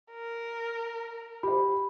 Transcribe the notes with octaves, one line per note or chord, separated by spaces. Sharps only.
A#4
G4 C5 B5